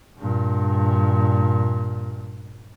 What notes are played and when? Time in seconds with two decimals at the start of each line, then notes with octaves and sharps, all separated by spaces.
0.18 G2 A#2